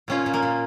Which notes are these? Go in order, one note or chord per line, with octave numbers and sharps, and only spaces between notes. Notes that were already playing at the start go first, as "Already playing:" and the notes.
A#2 C#4 F4
A#2
A#3
A#2